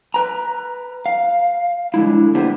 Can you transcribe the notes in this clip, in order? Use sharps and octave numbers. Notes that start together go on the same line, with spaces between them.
B4 A#5
F5
D3 G#3 E4
D3 A#3 B3 G4 C5